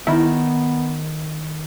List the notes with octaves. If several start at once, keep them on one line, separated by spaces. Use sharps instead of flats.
D#3 B3 E4